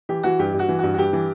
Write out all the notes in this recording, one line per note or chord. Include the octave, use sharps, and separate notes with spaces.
E3 G4
E3 F#4
G2 G4
G2
F#4
E3
G2 F#4
F#4
G2 G4
E3